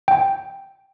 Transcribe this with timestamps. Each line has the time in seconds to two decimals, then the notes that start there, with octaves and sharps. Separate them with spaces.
0.08 G5